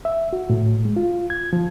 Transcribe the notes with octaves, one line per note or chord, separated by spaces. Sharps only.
E5
F#4
A2
G#3
F4
G#6
F3